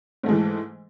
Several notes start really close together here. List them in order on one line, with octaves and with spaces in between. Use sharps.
G#2 A3 G#3 E3